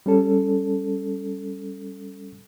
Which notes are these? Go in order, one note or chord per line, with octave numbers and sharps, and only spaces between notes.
G3 C#4 A4